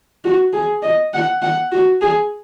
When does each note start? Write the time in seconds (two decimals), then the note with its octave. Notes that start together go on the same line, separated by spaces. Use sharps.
0.25 F#4
0.53 G#4
0.83 D#5
1.14 F#5
1.42 F#5
1.72 F#4
2.02 G#4